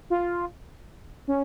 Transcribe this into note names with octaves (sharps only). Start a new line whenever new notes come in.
F4
C#4